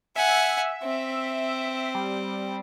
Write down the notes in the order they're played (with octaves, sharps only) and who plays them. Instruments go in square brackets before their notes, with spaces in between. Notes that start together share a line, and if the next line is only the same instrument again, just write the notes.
[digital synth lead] E5 [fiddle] F#5 G#5
[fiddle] C4
[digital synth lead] G3